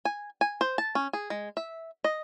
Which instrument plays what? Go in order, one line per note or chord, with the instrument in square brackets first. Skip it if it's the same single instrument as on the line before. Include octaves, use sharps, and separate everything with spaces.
[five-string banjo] G#5
G#5
C5
A5
C#4
G#4
G#3
E5
D#5